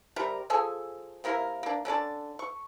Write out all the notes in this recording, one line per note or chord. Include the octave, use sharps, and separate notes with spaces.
C3 G3 A#4
F3 G#4 A4 G#5
C3 A#3 E4 A#4
A#3 D4
D3 C#4 D5 A5
C#6